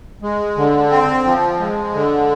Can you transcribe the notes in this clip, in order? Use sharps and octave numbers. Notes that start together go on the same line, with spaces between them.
G#3
D3
C4
F3
G#3
D3